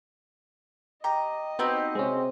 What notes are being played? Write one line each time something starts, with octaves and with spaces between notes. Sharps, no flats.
G4 D#5 A#5
B3 C4 D#4 F#4 G4
C3 G#3 C#4 C5